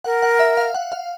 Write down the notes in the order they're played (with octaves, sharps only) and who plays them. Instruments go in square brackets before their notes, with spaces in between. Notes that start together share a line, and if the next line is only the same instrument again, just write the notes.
[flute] A#4 [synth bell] F#5
[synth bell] F#5
E5
F5
F#5
F5